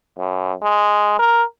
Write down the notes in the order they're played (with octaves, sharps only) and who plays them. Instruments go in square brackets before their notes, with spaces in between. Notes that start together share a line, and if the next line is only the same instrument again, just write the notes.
[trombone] F#2
G#3
A#4